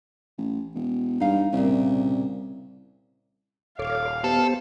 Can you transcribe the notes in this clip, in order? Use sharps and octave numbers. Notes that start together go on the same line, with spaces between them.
A1
E1
G2 D#4 F5
C2 A#2 C#3
D#1 A4 C#5 F5 D6
B3 G4 A4 C5